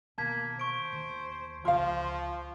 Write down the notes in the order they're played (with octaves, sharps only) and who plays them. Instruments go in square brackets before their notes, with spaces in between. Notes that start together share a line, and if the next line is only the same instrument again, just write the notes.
[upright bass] B2 D#3 [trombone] A#3 [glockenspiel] A5 G#6 B6
[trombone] C5 [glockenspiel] C#6 D7
[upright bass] D#2
[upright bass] C#2 C#3 [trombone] F3 [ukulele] F4 F5